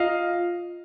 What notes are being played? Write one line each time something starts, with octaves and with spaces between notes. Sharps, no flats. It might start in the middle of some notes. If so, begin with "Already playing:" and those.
Already playing: F4 D#5 F5